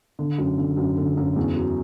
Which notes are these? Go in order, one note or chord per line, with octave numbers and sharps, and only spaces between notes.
D3
F#2
D3
F#2
D3
F#2
E2
F#3